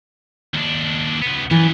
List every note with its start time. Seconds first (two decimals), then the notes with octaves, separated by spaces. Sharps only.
0.54 D#2 D4
1.22 C#2 B3
1.51 F#2 E3 B3